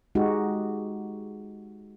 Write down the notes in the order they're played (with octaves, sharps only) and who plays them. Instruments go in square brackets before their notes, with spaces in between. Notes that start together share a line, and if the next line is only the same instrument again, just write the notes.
[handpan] G#3 D#4 F#4 G4